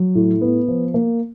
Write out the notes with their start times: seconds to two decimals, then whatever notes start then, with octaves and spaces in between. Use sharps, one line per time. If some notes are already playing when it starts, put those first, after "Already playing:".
Already playing: F#3
0.15 A2
0.41 B3
0.68 F3
0.94 A#3